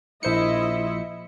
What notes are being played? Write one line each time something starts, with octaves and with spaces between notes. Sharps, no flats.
A#1 E4 C5 D#5 E5 C#7